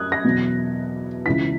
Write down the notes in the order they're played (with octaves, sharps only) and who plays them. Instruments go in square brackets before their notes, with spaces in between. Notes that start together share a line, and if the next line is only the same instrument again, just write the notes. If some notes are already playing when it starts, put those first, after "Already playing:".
Already playing: [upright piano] F#2 F#3 D#6 F#6 G#6
A#6
E2 B2 F#3
C#2 C#3 E3 B6